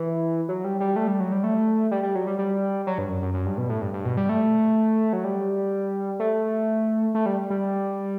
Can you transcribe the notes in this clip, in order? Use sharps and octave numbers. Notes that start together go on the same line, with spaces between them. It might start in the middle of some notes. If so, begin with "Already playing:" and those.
Already playing: E3
F#3
G3
G3
A3
G3
F#3
G3
A3
G3
G3
F#3
G3
G3
F#3
G2
F#2
F#2
F#2
G2
B2
A2
G2
G2
B2
G3
A3
F#3
G3
A3
A3
G3
G3